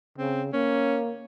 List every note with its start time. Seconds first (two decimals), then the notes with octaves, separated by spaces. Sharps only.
0.18 C#3 C4
0.53 A#3 C#4